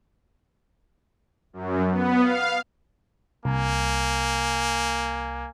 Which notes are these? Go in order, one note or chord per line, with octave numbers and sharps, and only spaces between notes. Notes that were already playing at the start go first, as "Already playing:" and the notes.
F#2
B3
F5
C2 A#3 G#5